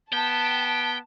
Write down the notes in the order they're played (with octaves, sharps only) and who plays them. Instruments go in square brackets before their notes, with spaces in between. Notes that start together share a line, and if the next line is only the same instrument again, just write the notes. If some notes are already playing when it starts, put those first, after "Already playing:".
[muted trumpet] B3 [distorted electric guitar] G5 [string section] A5